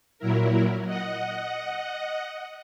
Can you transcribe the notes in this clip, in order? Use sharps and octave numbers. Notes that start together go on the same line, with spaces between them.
A#2 F#3 E4 A#4
D#5 F#5